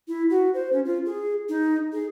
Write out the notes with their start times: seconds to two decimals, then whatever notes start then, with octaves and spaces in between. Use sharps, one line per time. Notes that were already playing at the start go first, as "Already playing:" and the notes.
0.08 E4
0.30 F#4
0.54 C5
0.73 C#4
0.85 F4
1.05 G#4
1.49 D#4
1.93 G#4